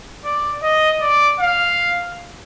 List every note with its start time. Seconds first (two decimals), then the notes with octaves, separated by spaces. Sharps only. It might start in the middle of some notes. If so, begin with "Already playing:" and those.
0.25 D5
0.63 D#5
1.02 D5
1.40 F5